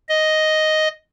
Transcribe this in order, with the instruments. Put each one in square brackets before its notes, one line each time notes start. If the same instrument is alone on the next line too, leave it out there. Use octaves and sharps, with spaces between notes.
[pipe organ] D#5